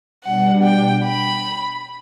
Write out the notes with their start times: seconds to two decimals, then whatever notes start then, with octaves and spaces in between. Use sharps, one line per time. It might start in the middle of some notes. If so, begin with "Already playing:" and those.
0.24 B2 G3 D4 F#5
0.63 G5
1.04 B5